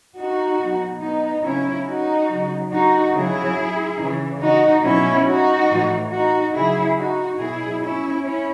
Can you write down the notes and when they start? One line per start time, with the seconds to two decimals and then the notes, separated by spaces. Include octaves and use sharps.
0.16 D#4 F#4
0.59 B2 F#3
1.01 B3 D#4
1.43 C#3 F#3 C#4 E4
1.87 D#4 F#4
2.29 C#3 F#3
2.71 D#4 F#4
3.13 C#3 F#3 E4 G#4
3.99 C#3 E3
4.41 D#4 F#4
4.83 B2 F#3 C#4 E4
5.26 D#4 F#4
5.69 A2 E3
6.11 D#4 F#4
6.53 C#3 F#3 E4 G#4
6.97 D#4 F#4
7.38 B2 F#3 E4 G#4
7.81 C#4 E4
8.23 C#4 E4